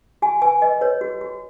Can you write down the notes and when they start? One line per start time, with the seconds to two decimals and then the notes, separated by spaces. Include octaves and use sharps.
0.22 F#4 G#5
0.42 B4 G#5
0.61 B4 D#5
0.81 B4 C#5
1.01 F#4
1.21 F#4